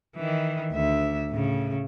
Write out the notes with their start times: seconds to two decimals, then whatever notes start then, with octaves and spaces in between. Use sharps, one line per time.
0.17 D#3 E3
0.72 D2 E5
1.30 A2 C#3